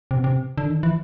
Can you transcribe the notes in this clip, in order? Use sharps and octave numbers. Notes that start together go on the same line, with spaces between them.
C3
B2
C3
D3
D#3
E3